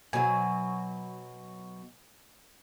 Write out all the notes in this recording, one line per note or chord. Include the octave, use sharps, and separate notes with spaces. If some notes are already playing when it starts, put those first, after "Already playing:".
B2 F#3 G#5